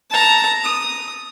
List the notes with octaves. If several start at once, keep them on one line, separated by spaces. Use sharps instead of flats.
A5 A#5
D#6